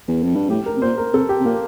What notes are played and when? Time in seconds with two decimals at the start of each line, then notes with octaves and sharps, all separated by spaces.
0.08 E2
0.23 F2
0.36 G2
0.49 A2 G4
0.66 A#4
0.76 C3
0.82 A#2 C5
0.98 A#4
1.13 C3 A4
1.29 G4
1.40 C3
1.45 A#2 A#3